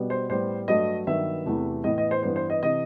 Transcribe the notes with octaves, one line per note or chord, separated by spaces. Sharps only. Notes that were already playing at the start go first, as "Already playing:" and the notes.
Already playing: B2 G3 B3
C5
A2 G3 B3 C5
G2 F#3 A3 D#5
G2 D#3 F#3 B3 E5
E2 C3 E3 A3
A2 E3 B3 D#5
D#5
C5
G2 E3 B3 C5
C5
D#5
C3 E3 D#5